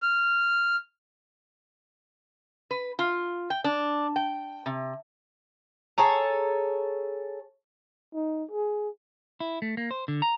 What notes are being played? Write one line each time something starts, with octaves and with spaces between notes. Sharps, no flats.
F6
B4
F4
G5
D4
G5
C3
G#4 A4 C#5 A#5
D#4
G#4
E4
A3
A#3
C5
D3
A#5